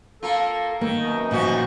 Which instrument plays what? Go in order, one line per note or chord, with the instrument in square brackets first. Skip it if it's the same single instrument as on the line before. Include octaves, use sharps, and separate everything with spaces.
[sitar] A#3 F4 [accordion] A4
[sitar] D#3 [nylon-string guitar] A#3
[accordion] F#2 B2 D#4
[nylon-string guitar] A#2 [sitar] D#3 F3 F#4